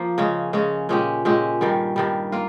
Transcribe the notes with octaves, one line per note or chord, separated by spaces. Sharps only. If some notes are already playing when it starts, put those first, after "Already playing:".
Already playing: F3 A#3
C#3 G#3 C#4
C#3 G#3 C#4
A#2 G#3 C#4 G4
A#2 G#3 C#4 G4
G2 D#3 G3
G2 D#3 G3
A#3 F4